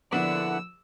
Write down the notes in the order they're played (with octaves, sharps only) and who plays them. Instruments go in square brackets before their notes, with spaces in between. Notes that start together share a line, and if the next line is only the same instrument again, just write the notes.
[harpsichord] A#1 [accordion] D3 F#5 [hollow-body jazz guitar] B3 D4 E4 [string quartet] E6